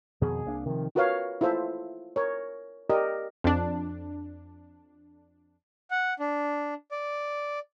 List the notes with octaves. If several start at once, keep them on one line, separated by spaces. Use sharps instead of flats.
F2 B2 D#3 G#4
C2 A#3 D4
C3 D#3 F3
F4 F#4 A#4 B4 C#5 F5
E4 F4 A4 C5 E5
A#4 C#5
G4 A#4 D5 D#5
F2 D4
F#5
D4
D5